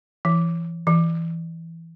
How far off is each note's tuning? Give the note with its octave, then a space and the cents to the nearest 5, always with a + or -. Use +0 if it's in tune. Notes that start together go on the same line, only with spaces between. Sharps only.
E3 +30
E3 +5